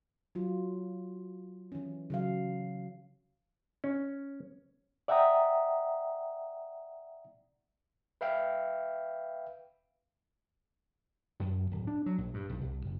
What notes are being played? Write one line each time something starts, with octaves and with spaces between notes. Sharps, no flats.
F#3 F4
E3 C#4
C#3 F#3 F5
C#4
D5 E5 F#5 G5 A#5 D#6
B4 E5 F5 G5
F#2
D1
D4
F#3
A#1
G2
B1
C2
F#1